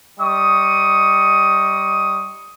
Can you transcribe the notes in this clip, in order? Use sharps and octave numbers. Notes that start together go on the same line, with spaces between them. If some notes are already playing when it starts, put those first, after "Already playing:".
G3 D#5 C#6 D#6